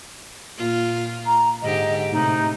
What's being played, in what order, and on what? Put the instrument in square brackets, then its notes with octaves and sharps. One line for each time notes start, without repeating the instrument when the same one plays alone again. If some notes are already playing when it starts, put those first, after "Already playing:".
[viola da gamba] A#2 F4
[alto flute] A#5
[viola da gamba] G#2 D3 G4 [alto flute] D#5
[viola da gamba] A2 C3 [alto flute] D#4